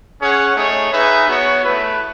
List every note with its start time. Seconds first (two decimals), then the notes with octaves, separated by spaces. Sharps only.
0.19 C#4 G#4 C#5 F#5
0.55 A3 D#4 G#4 C#5
0.91 D#4 G#4 B4 E5
1.26 B3 F#4 C#5
1.62 A3 E4 B4